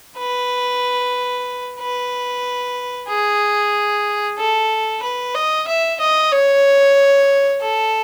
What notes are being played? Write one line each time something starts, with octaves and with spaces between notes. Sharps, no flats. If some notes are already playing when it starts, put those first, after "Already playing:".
B4
B4
G#4
A4
B4
D#5
E5
D#5
C#5
A4